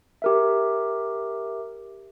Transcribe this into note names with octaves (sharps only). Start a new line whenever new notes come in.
G4 A#4 E5